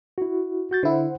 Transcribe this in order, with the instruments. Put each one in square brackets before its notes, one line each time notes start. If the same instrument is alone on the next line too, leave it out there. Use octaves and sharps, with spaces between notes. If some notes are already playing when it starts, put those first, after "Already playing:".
[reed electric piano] E4 F#4
F#4 G6 A6
[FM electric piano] D3 E4 [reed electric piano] C5 F#5